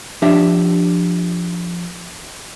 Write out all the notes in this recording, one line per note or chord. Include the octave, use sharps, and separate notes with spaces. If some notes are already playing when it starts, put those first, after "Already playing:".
F3 D4 G4 E5